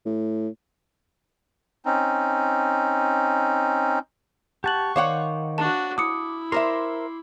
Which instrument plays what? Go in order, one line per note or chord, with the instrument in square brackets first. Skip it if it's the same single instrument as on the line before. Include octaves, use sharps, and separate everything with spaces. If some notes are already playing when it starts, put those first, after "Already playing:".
[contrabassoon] A2
[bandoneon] C4 C#4 D#4
[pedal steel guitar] G4 A5 [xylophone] F#5 F#6 F#7 [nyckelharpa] C#6
[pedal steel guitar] D#3 [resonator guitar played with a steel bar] C5 C#5 F#5 [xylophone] F5 D6
[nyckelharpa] D4 F#4 [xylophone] A5
[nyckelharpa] E4 [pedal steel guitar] D6 [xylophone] D#6 C#7
[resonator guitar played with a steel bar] A#4 C5 E5 [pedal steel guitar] C6 D6